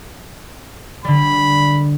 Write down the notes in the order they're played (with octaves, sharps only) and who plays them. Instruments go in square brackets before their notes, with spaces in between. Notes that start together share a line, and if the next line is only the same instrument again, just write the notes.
[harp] D3 G3 [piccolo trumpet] B5